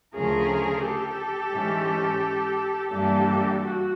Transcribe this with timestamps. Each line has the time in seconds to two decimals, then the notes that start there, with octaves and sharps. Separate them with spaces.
0.15 D2 C#3 F3 A3 C#4 G#4 A#4
0.84 G4 A4
1.54 G#2 E3 G#3 C#4
2.91 G2 E3 G3 A#3 D4 G4 A4
3.61 F#4